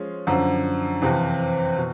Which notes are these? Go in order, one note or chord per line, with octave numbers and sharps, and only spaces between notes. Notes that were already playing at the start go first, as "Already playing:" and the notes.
Already playing: F3 G#3 C#4 F4
F#2 D3 F3
F2 C3 E3
B2